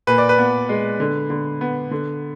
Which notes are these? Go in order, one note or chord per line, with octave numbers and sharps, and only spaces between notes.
A#2 B4
D5
B4
B3
G#3
D3
D3
B3
D3